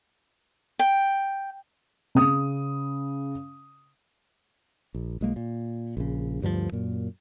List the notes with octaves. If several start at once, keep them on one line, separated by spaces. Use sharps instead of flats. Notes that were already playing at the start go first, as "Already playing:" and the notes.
G5
C#3 D#6
A#1
B1 G#3 A#3
A#2
A#1 C#3
D2 G2 D3 F3
F#2 A#2